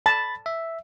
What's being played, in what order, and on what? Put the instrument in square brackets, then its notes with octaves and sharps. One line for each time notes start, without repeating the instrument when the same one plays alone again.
[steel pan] A5 [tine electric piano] B5 A6
[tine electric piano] E5